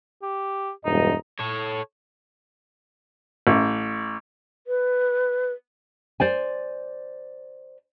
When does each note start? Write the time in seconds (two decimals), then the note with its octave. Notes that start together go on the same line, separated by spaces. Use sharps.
0.22 G4
0.85 E1 G2 D#4 D#5
1.40 A4 C#5
3.47 A1
4.67 B4
6.20 C5 D5 G#5